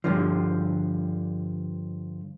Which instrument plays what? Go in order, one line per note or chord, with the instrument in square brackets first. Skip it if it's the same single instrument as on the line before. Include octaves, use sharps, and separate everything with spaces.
[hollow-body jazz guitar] G2 A#2 D3 F3